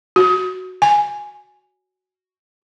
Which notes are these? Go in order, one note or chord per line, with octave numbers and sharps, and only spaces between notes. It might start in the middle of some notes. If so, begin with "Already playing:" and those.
F#4
G#5